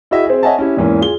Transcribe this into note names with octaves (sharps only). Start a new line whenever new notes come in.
E4 F#4 G#4 D#5 E5
C4 G#4
C#5 D#5 E5 F#5 G#5 A5
C#4 E4 G4
E2 G#2 E3 A#3 C#4
F4 G#4 G7